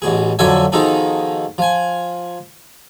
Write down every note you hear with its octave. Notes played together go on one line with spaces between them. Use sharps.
A1 B2 G#4
F2 D3 F#3 A4 E5 G#5
B2 D#3 F3 D#4 G#4 A4
F3 G#5